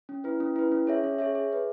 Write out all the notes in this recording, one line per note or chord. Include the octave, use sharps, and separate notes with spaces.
C#4
E4 B4
C#4
E4 B4
C#4
G#4 C#5 E5
C#4
G#4 C#5 E5
G#4
B4 E5